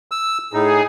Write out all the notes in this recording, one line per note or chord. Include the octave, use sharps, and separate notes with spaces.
E6
A2 D#4 G#4